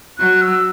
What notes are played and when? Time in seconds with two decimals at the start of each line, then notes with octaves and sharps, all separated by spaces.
0.18 F#3 F#6
0.42 E6